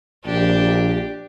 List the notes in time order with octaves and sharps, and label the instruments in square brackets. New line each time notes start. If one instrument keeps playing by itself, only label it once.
[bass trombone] A#1 [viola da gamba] D4 G4